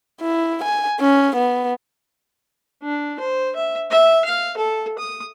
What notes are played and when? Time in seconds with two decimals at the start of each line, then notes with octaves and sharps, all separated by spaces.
0.21 E4
0.64 G#5
1.00 C#4
1.36 B3
2.83 D4
3.20 C5
3.56 E5
3.91 E5
4.25 F5
4.57 A4
4.99 D#6